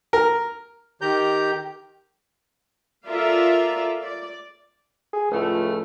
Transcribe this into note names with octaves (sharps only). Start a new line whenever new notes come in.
A#4
D#3 G4 A#5 G6
F4 A4 A#4 D5 E5 F5
D5
G#4
C#2 A2 F3 A3